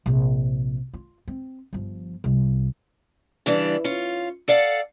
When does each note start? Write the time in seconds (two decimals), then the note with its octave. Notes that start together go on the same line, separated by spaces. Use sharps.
0.06 A#1 C3
0.94 F4
1.28 C4
1.73 G1 F3
2.24 C2
3.46 C#3 E3 G3 D4
3.84 C#4 F4
4.48 A4 D5 F5 F#5